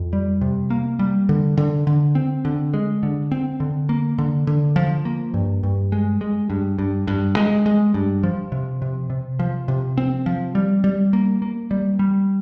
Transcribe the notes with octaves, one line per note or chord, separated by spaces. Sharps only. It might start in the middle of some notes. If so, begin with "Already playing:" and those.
Already playing: F2
G3
C3
A#3
G3
D3
D3
D3
C4
D3
G#3
D3
C4
D3
A#3
D3
D3
F3
A#3
G2
G2
G#3
G#3
G2
G2
G2
G#3
G#3
G2
F3
C3
C3
C3
F3
C3
C4
F3
G3
G3
A#3
A#3
G3
G3